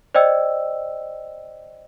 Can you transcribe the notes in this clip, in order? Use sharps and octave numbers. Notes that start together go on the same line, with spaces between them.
C5 D5 D#5 G5 E6